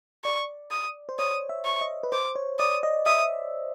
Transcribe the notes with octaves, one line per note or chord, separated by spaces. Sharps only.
D5 C#6
D#6
C5
C#5 D#6
E5
C#6
D#5
B4
C5 D6
C#5
D5 D#6
D#5
E5 D#6